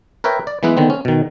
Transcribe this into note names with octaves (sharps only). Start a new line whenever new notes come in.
A#4 B4 C#5 E5 G5
D5
E3 G#3 B3 E4 B4
D3 D#3 B3 C4
C#4
B2 D#3